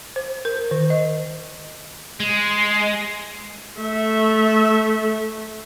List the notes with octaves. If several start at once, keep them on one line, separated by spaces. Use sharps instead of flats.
C5
A#4
D#3
D#5
G#3
A3 E5